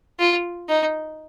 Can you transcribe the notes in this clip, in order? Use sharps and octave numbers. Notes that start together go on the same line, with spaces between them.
F4
D#4